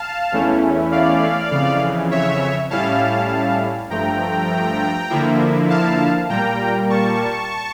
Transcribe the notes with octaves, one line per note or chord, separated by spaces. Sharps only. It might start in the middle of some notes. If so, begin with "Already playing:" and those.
Already playing: F5 A5
E2 E3 A3 C#4 E4
D5 F5
F2 C#3 E3
C#5 E5
A2 G3 C#4 E4 F5 A5
G2 F3 A3 G5 A#5
D3 F3 A#3 E4
F5 A5
A#2 G3 A#3 G5 A#5
A5 C#6